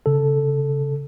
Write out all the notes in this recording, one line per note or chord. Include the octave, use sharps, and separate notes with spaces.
C#3 A4